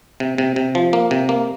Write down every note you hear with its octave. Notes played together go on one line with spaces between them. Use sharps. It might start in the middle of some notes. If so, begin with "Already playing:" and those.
C3
C3
C3
F3
A#3
C3
A#3